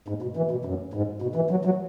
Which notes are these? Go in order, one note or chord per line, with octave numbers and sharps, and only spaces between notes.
G#2
B2
E3
B2
F#2
G#2
B2
E3
F#3
F#3